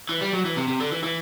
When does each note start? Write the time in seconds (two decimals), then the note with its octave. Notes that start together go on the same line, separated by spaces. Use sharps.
0.09 E3
0.21 G3
0.33 F#3
0.45 E3
0.57 C3
0.68 C3
0.80 D3
0.92 E3
1.04 E3